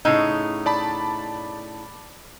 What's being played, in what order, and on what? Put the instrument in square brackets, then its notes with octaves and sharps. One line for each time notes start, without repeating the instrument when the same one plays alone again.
[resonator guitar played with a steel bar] A2 C#3 D#4
[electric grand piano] D5 A5 B5